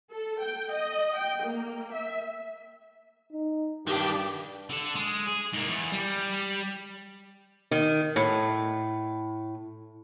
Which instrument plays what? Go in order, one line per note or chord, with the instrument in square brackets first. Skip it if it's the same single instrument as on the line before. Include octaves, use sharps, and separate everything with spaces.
[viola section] A4
G5
D#5
G5
A#3
E5
[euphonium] D#4
[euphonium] G2 [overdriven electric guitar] D#3 D4 [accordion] G4
[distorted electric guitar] D3 A4
G#3
G#4
G#2 A#3
E2
G3
[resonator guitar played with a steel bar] D#3
A2